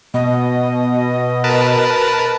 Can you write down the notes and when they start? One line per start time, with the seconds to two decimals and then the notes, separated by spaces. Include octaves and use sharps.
0.14 B2 D#5
1.44 A#4 B4 A5